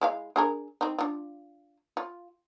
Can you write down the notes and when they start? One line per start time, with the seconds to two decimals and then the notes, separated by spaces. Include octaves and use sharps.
0.01 G#3 E4 F5
0.36 D4 G#4 A#4
0.81 C4 D#4
0.98 D4 F4
1.97 F4